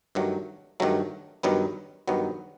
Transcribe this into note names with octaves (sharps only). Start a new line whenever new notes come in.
G2 D#3 F#3 A3
G2 D#3 F#3 A3
G2 D#3 F#3 B3
G2 D#3 F#3 B3